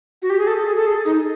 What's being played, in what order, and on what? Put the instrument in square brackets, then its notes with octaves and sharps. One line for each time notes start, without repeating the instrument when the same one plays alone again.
[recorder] F#4
G4
G#4
A4
G#4
A4
G#4
D#4